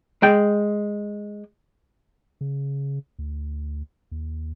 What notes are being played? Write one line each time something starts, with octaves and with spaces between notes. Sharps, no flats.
G#3 G5
C#3
D2
D#2